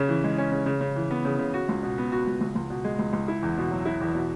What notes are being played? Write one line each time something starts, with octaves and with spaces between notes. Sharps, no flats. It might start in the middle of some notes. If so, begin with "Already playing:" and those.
Already playing: C#3 C#4
E3
G#3
C#4
C#3
C#3
C#3
E3
B3
C#3
C#3
F#4
C#2
B2
B3
F#4
C#2
C#2
C#2
B2
G#3
C#2
C#2
E4
E2
B2
F#3
E4
E2
B2